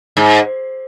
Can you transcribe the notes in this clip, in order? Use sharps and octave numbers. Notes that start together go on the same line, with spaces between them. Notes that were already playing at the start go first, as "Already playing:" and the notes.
G#2